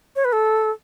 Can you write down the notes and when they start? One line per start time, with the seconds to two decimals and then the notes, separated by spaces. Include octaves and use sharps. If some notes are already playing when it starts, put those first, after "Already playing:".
0.16 C#5
0.24 B4
0.32 A4